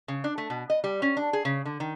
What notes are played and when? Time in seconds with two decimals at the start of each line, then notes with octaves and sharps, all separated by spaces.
0.08 C#3
0.24 D4
0.38 A3
0.50 B2
0.70 D#5
0.84 G3
1.02 C#4
1.17 D4
1.33 G#4
1.45 C#3
1.65 D3
1.80 D#3